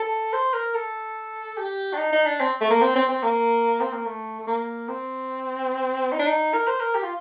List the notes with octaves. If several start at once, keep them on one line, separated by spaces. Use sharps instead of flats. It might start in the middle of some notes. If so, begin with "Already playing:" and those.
Already playing: A4
C5
A#4
A4
G4
D4
D#4
D#4
D4
C4
A3
A#3
C4
C4
C4
A#3
C4
A#3
A3
A3
A#3
C4
D#4
D4
D#4
A#4
C5
A#4
G4
F4